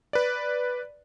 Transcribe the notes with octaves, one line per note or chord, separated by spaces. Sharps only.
B4 D5